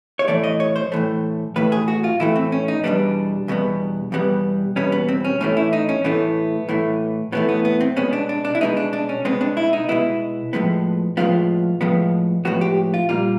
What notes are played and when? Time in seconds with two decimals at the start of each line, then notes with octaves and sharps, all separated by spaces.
0.19 C#5
0.28 A2 E3 A3 D5
0.44 D#5
0.60 C#5
0.76 C5
0.92 A2 E3 A3
1.56 A2 E3 A3 B4
1.72 G#4
1.88 F#4
2.04 F4
2.20 A2 E3 A3 E4
2.36 C4
2.52 C#4
2.68 D#4
2.84 E2 B2 G3 B3 D4
3.48 E2 B2 G3 B3
4.12 E2 B2 G3 B3
4.76 E2 B2 G3 B3 C#4
4.92 B3
5.08 C4
5.25 C#4
5.41 A2 E3 A3 C#4
5.57 E4
5.73 D#4
5.89 C#4
6.04 A2 E3 A3 B3
6.69 A2 E3 A3
7.32 A2 E3 A3 B3
7.49 B3
7.65 B3
7.81 C4
7.96 B2 G#3 B3 C#4
8.13 D4
8.29 D4
8.45 D4
8.55 E4
8.61 B2 G#3 B3 D#4
8.77 D4
8.93 D4
9.09 C#4
9.25 B2 G#3 B3 C4
9.41 D4
9.57 E4
9.73 D#4
9.89 B2 G#3 B3 E4
10.53 A2 F3 G#3 B3
11.17 A2 F3 G#3 B3 F4
11.81 A2 F3 G#3 B3
12.45 A2 F3 G#3 B3 F#4
12.61 G4
12.94 F4
13.09 A#2 G3 A#3 F4